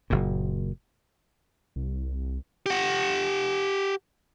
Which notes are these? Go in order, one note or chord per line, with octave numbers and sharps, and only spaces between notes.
F#1 A#2
C2
G4 F#5